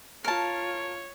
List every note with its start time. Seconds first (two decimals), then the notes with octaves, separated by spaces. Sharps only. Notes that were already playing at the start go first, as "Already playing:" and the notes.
0.24 F4 A#4 C#5 A5